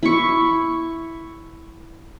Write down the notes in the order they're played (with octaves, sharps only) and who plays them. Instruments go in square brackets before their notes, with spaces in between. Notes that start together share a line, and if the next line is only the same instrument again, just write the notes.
[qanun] E4 C#6